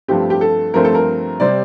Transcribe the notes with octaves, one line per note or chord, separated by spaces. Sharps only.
G2 F3 A3 C4 G4
G4
A4
G2 F3 A3 C4 A#4
A4
A#4
C3 G3 C4 D5